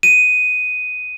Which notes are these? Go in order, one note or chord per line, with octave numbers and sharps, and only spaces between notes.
D#7